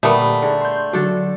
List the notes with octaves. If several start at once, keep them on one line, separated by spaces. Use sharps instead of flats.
A#2 D3 G3 A3 B3 A#4
D3 G#4
C6 G6
D3 F#3 D4 F#4 A4